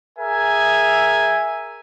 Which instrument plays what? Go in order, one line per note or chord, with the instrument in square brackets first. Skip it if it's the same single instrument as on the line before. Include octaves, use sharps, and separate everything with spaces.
[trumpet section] G#4 A#4 E5 G#5